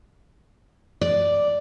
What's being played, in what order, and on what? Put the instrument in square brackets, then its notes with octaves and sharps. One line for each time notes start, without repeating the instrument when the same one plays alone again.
[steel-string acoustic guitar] D5